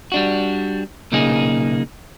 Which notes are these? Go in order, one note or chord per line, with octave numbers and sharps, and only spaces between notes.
G3 D4 F#4
B1 A#2 C#3 A#3 D#4 G#4